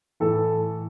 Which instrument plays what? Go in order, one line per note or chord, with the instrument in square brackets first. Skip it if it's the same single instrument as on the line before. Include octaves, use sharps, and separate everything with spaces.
[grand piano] A2 E3 A4